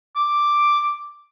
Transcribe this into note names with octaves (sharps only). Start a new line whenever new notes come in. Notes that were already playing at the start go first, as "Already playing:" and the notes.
D6